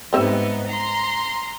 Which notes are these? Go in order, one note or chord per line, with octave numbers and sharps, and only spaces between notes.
G#2 G3 B3 C4 D#4 E5
A#5 C6